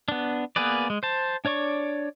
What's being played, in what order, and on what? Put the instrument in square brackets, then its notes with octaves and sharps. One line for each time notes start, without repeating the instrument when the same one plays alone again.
[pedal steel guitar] B3 D4
A#3 B3 G#4 B4 D5
G#3
C5 A5
D4 C#5 D5 C#6